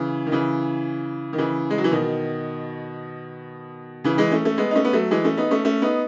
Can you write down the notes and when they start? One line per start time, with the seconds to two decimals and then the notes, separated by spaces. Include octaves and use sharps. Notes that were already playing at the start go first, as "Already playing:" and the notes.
Already playing: C#3 E3
0.27 D#3
0.32 C#3 E3
1.33 D#3
1.38 C#3 E3
1.70 G#3
1.78 F#3
1.84 E3
1.91 B2 D#3
4.04 C#3 E3
4.18 E3 G#3
4.31 A3 C#4
4.45 A3 C#4
4.58 G#3 B3
4.71 D#4
4.75 A3 C#4
4.85 B3
4.93 F#3 A3
5.11 E3 G#3
5.24 A3 C#4
5.37 B3 D#4
5.51 A3 C#4
5.65 A3 C#4
5.82 B3 D#4